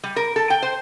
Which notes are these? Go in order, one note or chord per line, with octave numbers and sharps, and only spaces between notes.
G3
A#4
A4
G5
C5